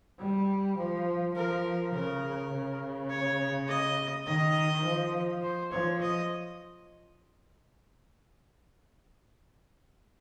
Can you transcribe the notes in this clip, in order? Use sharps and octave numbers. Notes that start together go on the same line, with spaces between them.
G3
F3
F3 A#4
C#3 A#4
C#3
C#5
D#5
D#3 D#5
F3
C5
F3 C#5
D#5